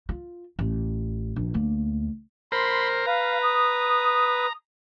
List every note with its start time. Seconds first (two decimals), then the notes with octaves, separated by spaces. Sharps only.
0.09 F4
0.59 A1
1.36 A#1
1.54 D2 A#3
2.52 A#4 C5 B5 C6
3.06 B4 F5 A#5
3.42 D#6